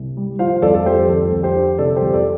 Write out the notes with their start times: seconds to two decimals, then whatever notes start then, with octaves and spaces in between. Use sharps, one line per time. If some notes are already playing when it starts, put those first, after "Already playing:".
Already playing: C2
0.17 G3
0.39 F3 C5 F5
0.62 F2 A4 D5
0.74 A4
0.86 F2 G4 C5
1.09 F2 A4
1.32 F2
1.43 G4 C5
1.55 D3
1.78 C3 A4 D5
1.96 G4 C5
2.01 F2
2.13 A4 D5